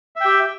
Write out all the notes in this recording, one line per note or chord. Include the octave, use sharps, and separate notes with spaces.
G4 E5 G5